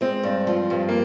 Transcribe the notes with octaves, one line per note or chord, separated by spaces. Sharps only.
G#3 C4
G2
F3
G2
A#3